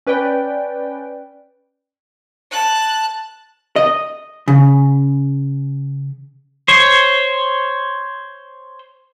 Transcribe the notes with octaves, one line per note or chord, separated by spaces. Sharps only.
C#4 B4 D5 G5
A5 F#6
D#5
C#3
C5 C#5